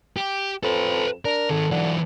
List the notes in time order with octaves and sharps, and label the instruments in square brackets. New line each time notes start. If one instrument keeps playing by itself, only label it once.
[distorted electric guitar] G4
[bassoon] F2 [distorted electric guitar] A4 B4
[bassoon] D4 [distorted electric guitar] A#4
[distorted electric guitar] D#3 G#4 [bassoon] A4
[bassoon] D3 [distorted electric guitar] E3 F#3